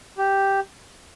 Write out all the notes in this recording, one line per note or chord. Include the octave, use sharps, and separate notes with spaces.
G4